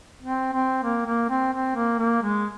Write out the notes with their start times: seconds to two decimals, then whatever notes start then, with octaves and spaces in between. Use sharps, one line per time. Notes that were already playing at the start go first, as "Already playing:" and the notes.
0.23 C4
0.53 C4
0.83 A#3
1.06 A#3
1.29 C4
1.52 C4
1.75 A#3
1.99 A#3
2.22 G#3